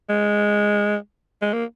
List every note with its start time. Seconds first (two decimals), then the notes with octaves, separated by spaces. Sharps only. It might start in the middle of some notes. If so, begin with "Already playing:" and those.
0.09 G#3
1.42 G#3
1.53 A#3